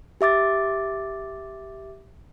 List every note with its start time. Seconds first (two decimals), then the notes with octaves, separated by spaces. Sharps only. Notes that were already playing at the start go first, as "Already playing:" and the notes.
0.21 G4 E5 D6 A6